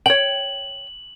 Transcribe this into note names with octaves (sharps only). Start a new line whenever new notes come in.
C#5 G5 F#7